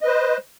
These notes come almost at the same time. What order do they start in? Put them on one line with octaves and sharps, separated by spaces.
D#5 B4 C5